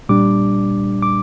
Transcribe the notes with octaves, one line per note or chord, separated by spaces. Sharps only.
A#2 G3 D4 D6
D6